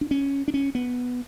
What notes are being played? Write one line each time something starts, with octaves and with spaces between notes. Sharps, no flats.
D4
C#4
D4
C#4
B3